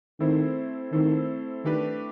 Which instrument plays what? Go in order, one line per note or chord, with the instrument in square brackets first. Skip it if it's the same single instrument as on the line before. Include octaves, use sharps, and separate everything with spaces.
[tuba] D#3 [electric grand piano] A3 C4 E4 A4 C5
[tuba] D#3 [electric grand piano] A3 C4 E4 A4 C5
[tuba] D#3 [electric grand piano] A3 D4 G4 B4